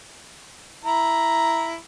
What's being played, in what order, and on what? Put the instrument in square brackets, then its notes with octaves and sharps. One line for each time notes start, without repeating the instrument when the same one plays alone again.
[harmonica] E4 A#5